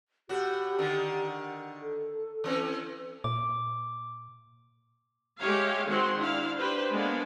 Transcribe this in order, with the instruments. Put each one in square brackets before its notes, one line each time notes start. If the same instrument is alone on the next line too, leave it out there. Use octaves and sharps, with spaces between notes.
[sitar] A2 F#4 [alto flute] G4
[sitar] D3 D#3
[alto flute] A4
[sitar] E3 C4 C#4
[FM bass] A#2 [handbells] D6
[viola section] G#3 G4 C#5 E5 F5
D#3 G#3 C4 F#4 F#5 C6
D4 E4 F5
D4 G4 B4 C5
G#3 A#3 B3 D4 F5